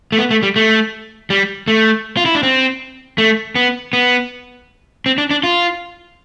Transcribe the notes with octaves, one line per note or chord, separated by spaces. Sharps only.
A3
B3
A3
G3
A3
G3
A3
F4
E4
D4
C4
A3
B3
B3
C4
D4
D4
F4